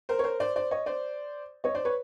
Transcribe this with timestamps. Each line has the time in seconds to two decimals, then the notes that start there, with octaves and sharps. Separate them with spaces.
0.09 A#4 C5
0.19 C#5
0.24 A#4 C5
0.40 C5 D5
0.56 C5 D5
0.71 C#5 D#5
0.86 C5 D5
1.64 C#5 D#5
1.75 C5 D5
1.85 B4 C#5